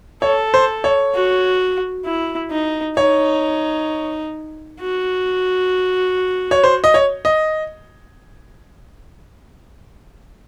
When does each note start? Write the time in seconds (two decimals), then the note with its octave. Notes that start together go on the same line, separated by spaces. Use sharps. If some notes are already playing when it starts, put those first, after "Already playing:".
0.22 A4 C#5
0.54 C5
0.84 C#5
1.14 F#4
2.05 E4
2.51 D#4
2.97 D#4 C#5
4.81 F#4
6.51 C#5
6.64 C5
6.84 D#5
6.94 C#5
7.25 D#5